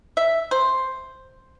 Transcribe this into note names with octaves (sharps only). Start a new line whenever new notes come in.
E5
C5